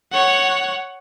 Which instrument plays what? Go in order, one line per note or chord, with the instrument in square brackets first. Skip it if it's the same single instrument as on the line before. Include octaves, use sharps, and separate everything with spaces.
[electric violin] C#5 F#5